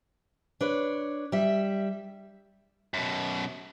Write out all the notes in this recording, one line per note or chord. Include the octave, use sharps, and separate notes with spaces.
D4 B4 C#5
G3 E5
F#2 B2